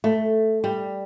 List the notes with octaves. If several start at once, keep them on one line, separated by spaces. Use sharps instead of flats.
A3
G3